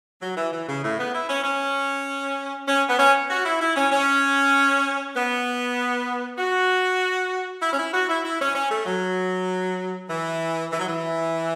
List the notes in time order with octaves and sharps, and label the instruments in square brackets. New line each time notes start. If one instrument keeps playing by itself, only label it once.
[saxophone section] F#3
E3
E3
C#3
A2
B3
E4
C#4
C#4
C#4
B3
C#4
F#4
E4
E4
C#4
C#4
B3
F#4
E4
C#4
E4
F#4
E4
E4
C#4
C#4
A3
F#3
E3
E3
F#3
E3